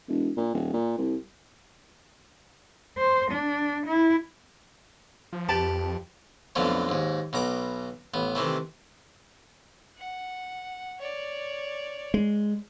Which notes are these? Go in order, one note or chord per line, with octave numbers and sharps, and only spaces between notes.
E1
A#2
D#1
A#2
C2
C5
D4
E4
F3
F2 G4 B4 G5 A5
B1 F2 B2 D3 F3 A3
D#2 G#2
B1 B2 A#5 D6
A1 B3
C3 D#3 E3 A3
F#5
C#5 D5
G#3